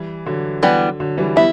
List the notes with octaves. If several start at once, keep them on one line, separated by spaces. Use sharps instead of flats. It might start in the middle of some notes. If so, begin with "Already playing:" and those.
Already playing: E3 G3
D3 F#3
E3 G3 B3
D3 F#3
E3 G3
G3 B3 E4